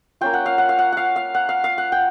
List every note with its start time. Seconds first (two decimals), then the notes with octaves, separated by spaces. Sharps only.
0.21 A#3 C#4 F4 G5
0.33 F#5
0.46 F5
0.58 F#5
0.69 F5
0.79 F#5
0.92 F5 F#5
1.16 F5
1.34 F#5
1.49 F5
1.64 F5
1.78 F#5
1.92 G5